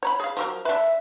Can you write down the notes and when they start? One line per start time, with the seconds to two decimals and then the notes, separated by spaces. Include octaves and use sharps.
0.03 C#5 A#5 B5
0.20 G#4 F5
0.37 F3 F#3 A#4
0.65 D4 B4 E5